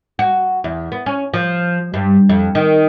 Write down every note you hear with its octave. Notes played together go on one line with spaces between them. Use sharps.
F#4
E2
B3
C#4
F3
G2
F2
D#3